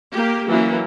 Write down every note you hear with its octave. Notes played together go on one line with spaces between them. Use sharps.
A#3 G4
E3 F#3 A#3 C#4